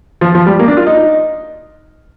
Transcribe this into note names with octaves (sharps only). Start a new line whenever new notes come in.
F3
F3
G3
A#3
D4
F4
D#4